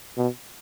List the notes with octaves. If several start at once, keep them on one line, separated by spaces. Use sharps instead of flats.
B2